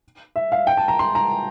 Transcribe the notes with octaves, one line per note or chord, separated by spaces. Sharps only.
E5
F5
G5
A5
A#5
C6
A#5